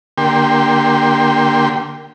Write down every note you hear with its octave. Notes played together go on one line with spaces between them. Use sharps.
D3 A#3 G4 G5 C6